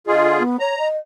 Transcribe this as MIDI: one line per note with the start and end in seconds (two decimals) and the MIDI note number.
0.07 0.43 50
0.07 0.43 65
0.07 0.43 68
0.07 0.38 75
0.39 0.56 59
0.59 0.75 73
0.59 0.88 82
0.78 0.95 75